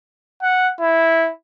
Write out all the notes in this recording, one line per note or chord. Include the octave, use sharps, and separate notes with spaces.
F#5
E4